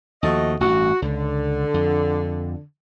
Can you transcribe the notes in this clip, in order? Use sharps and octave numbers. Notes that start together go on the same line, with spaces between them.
D#2 F3 A3 F#4 D#5
A1 G2 F#4
C#2 D3
F2